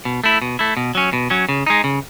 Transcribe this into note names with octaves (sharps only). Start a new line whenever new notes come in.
B2
A3 E4
B2
A3 E4
B2
F#3 C#4
B2
F#3 C#4
C#3
G#3 D#4
C#3